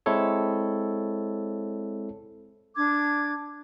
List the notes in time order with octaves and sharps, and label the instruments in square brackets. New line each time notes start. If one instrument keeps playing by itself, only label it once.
[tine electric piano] G#3 C4 E4 A4 C#5
[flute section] D4 D6 G#6